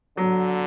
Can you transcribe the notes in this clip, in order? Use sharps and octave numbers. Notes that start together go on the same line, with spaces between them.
D3 F#3